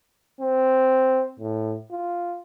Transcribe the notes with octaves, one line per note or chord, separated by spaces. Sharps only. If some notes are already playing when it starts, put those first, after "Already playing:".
C4
A2
F4